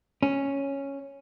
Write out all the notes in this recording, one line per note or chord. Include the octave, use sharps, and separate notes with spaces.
C#4